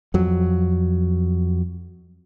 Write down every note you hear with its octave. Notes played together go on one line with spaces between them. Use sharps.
F2 F#3